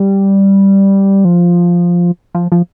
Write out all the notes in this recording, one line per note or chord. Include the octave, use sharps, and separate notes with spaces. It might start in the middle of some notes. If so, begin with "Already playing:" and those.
Already playing: G3
F3
F3
F3